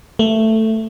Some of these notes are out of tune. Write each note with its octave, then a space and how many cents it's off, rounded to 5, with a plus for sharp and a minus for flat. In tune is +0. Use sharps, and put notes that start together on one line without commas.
A3 +10